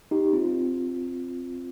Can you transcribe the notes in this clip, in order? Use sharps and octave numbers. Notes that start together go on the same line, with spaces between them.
D#4 G4
C4 F4